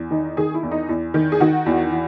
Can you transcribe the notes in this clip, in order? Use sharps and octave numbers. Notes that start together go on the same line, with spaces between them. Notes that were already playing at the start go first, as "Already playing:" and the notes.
Already playing: E2
D#3 D#4
D#3 G#4
E4
E2
D#4
E2
D#3
G#4
D#3 F#4
E2
E3